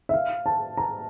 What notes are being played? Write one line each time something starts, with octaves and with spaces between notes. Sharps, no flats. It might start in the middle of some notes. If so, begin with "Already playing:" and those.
E5
F5
A5
A#5